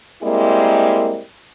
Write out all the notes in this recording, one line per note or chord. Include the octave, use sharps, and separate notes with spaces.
G3 G#3 A#3 C4 E4 A#4